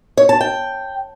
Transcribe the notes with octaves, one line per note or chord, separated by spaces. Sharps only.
C#5
A5
G5